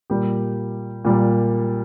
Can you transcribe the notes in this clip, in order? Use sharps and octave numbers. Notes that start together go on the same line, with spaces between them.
A#2 G3 A#3 G4
A#2 G3 A#3